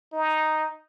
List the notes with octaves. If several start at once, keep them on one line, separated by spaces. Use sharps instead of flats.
D#4